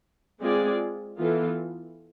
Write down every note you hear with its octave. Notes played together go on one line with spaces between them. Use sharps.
G#3 C4 F4 G#4 D5
E3 B3 F4 A4